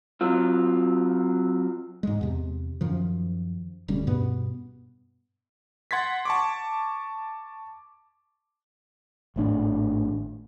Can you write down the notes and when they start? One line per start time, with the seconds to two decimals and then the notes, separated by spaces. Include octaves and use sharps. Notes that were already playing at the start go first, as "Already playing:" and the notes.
0.21 F#3 C4 F4
2.03 G#2 G#3
2.21 E2 C3
2.81 F#2 D#3 F3
3.88 D#1 D2 G3 C#4
4.07 G2 B2 B3
5.91 F#5 C6 G#6 A6 B6
6.25 A5 C#6 D6
9.36 G#1 A2 D4